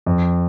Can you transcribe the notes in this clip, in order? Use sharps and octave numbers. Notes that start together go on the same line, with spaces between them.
F2